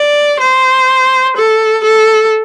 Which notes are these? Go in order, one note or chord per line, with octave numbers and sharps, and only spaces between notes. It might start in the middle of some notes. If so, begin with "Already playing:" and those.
Already playing: D5
C5
A4
A4